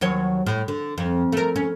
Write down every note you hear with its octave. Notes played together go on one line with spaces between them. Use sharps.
D#2 F#3 C#5
A2
D3
F2
A3 A#4
C#4